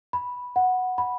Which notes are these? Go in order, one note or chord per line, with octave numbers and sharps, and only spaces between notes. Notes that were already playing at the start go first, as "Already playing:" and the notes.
B5
F#5
B5